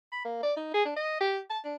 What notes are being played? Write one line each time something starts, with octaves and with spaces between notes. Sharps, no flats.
B5
A#3
D5
D#4
G#4
D4
D#5
G4
A5
D4